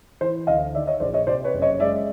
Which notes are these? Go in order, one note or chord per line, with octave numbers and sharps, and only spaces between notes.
E3 C5
D2 D#5 F5
D#3 D5 E5
C#5 D#5
A#1 C5 D5
C#5 D#5
C3 C5 D5
B4 C#5
F#1
C#5 D#5
G#3 D5 E5